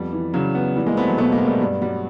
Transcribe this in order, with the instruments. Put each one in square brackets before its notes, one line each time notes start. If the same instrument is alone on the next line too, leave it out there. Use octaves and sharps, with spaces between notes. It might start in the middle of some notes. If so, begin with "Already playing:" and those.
Already playing: [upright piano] F2 B3 [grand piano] G3
[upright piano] E3
[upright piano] C#3 [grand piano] F#3
[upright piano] B3
[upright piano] E3 [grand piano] G3
[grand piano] G#3 A#3
[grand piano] A3 B3 [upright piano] C4
[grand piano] F#3
[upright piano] B2 [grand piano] A3 B3
[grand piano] G#3 A#3
[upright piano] B3
[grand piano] G3 A3
[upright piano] G2 [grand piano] G3
[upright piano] F#3 [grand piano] G3